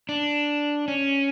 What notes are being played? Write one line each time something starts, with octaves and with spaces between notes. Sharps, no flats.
D4
C#4